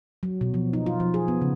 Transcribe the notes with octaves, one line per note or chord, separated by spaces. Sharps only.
F#3
B2
F3
D#4
F4
F3
G#4
B3
C#3